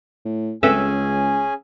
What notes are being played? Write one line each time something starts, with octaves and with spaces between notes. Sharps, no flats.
A2
C#2 C4 C#4 G#4 A4 B4 E5 G#5